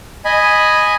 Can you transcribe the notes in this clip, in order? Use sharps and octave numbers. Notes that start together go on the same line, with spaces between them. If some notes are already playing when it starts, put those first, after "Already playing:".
D#5 G#5 B5